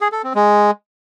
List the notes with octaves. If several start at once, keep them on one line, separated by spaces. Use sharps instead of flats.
G#4
A4
C4
G#3